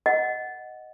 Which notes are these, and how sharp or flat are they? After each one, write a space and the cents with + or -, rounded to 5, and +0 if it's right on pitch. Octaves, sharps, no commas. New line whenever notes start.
D#5 +0 F#5 +5